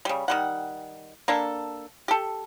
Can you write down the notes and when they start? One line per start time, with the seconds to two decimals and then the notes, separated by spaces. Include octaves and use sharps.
0.05 C#3 G3
0.28 D#3 G3 F#5
1.28 A#3 D4 A4
2.08 G4 A4